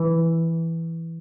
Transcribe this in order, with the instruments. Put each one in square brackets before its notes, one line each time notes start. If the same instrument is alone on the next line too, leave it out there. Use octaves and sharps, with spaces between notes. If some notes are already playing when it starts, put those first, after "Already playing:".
Already playing: [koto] E3